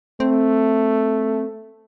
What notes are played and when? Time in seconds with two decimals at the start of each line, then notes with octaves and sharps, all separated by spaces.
0.20 A3 C4